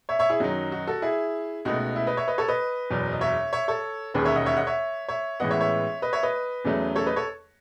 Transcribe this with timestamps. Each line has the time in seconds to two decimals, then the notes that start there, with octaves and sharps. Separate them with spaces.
0.09 C#5 E5
0.19 C#5 E5
0.30 E4 G#4
0.40 F#2 D#3 F#3 D#4 F#4
0.72 D#4 F#4
0.87 F#4 A4
1.02 E4 G#4
1.65 C#2 B2 A3 D#4 F#4
1.96 E4
2.07 B4 D#5
2.17 C#5 E5
2.28 B4 D#5
2.38 A4 C#5
2.48 B4 D#5
2.90 F#1 E2 B2 F#3
3.13 D#5
3.21 C#5 E5
3.52 C#5 E5
3.68 A4 C#5
4.14 E1 D#2 C#3 G#4 B4
4.25 C#5 E5
4.35 D#5 F#5
4.46 C#5 E5
4.57 D#5 F#5
4.67 C#5 E5
5.08 C#5 E5
5.40 A1 A2 E3 G#3 B3 D#5 F#5
5.50 C#5 E5
5.60 C#5 E5
6.02 B4 D#5
6.13 C#5 E5
6.23 B4 D#5
6.64 E2 C#3 F#3 A3
6.96 A4 C#5
7.06 B4 D#5
7.16 A4 C#5